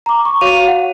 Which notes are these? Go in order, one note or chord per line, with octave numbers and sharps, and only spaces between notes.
A#5 D6
C#6
F#4 C#5 F5 D#7 F7
F#5